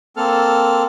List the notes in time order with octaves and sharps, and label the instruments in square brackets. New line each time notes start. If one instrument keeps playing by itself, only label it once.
[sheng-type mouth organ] A#3 C4 A4 F6